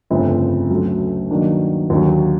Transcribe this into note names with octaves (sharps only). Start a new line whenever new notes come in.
G1 F2 C#3 F3 A3
D2 C#3 F#3 A3
G2 D#3 F#3 A#3 D4
D#2 D3 F#3